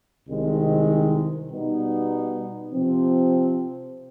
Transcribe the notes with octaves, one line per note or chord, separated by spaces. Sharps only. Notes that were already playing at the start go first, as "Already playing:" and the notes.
C2 C3 D#3 G#3 C4
B2 G3 B3 D#4
C3 F3 C4